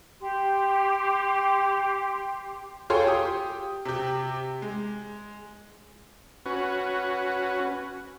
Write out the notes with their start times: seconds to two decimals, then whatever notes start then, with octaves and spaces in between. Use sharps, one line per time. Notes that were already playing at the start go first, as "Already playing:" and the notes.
0.21 G4 C6
2.90 F4 G#4 A4 C#5 G5 C6
3.07 G4 D#6
3.85 C3 G4
4.62 G#3
6.46 C#4 F#4 B4